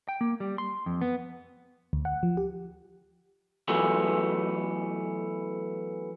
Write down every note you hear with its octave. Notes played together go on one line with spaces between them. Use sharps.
G5
A#3
G3
C6
F2
B3
D2
F#5
F3
G4
E3 F#3 A3 B3